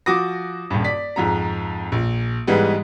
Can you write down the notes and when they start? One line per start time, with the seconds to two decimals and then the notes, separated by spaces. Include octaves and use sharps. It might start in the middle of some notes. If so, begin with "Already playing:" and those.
0.06 F3 F#4 D6 D#6 A#6
0.70 D#1 G2
0.84 D5 B6
1.16 F2 G#2 A#5
1.92 A#1
2.47 G#2 E3 G3 G#3 B3